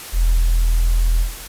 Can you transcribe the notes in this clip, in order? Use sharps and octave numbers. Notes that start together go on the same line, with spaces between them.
E1